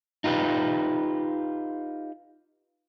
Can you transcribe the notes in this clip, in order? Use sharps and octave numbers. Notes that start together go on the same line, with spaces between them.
D#4 F4 G4 B4